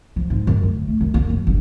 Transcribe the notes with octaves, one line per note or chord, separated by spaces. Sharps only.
F3
G#2
F#2
D2
A3
F#2
A#3
F#2
G1